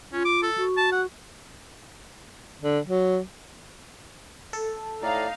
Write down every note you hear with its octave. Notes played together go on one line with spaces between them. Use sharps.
C#4 F4
D6
A4
F#4
A5
F#5
D3
F#3
A4
A2 D#4 D5 F5 A#5